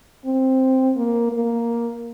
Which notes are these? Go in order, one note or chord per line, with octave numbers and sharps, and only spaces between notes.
C4
A#3
A#3